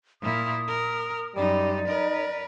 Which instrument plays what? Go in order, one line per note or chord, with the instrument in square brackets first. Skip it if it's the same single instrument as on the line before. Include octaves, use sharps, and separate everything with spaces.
[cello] A#2 E4 [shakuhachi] D#6
[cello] A#4
[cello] F#2 D#4 [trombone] G3 [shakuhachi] D5
[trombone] D#4 [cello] A#4 B4